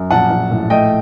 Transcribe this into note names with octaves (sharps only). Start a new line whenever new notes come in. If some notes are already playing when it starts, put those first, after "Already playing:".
Already playing: F#2
A#1 F#5 A5
A#1
A2
A3 D#5 G5